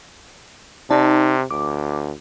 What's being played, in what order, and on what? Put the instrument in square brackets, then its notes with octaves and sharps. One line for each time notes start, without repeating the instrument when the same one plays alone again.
[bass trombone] C3 [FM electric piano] D#4 D5 A5
[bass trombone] D2 [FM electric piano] D6